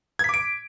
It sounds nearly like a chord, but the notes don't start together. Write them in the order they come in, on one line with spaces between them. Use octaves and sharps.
G#6 B6 D6 D7